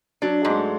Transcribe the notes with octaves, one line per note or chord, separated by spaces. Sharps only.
F#3 D4
G#2 G#3
A3